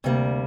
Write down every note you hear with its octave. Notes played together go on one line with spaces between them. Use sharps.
D2 C3 G3 A#3